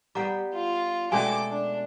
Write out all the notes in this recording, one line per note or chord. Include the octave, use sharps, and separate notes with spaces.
G3 B3 F#5 G5 A#5 D6
F4
B2 G#3 A3 C#4 A4 D5 G#5 D6
D4